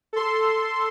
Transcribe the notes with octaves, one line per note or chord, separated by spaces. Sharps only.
A4 C6